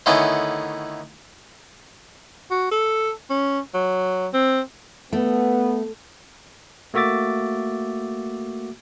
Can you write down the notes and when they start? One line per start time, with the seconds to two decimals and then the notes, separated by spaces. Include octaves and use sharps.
0.06 D3 D#3 A3 B3 C#4 E4
2.51 F#4
2.71 A4
3.30 C#4
3.74 F#3
4.33 C4
5.13 A3 B3
6.94 A3 A#3 F#4 E5 D6 A6